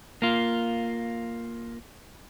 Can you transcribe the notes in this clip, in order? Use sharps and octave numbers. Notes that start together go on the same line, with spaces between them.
A#3 F4